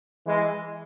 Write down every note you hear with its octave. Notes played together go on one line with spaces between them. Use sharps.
E3 G#3